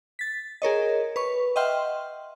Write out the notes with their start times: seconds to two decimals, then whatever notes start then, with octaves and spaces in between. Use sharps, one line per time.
0.19 A6 B6
0.62 G#4 A#4 C#5 D#5
1.16 B4 C#6
1.56 D#5 E5 F#5 G5 C6 F6